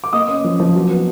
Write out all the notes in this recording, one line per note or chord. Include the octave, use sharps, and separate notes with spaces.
D6
A#3 D#5 D#6
C#4
F3
F3
F#3
B3